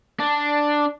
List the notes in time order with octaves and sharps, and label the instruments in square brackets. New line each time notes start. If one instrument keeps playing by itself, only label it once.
[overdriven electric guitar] D4